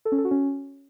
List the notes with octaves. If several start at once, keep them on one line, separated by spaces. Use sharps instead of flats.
A4
C#4
A4
F#4
C#4